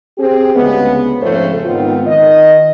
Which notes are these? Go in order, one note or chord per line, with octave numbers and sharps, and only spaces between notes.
C4 G4 G#4
D2 C#3 G#3 B3
F2 G#2 C#3 A3 C5 C#5
G#2 D#3 B3 C4 F4
D#3 D#5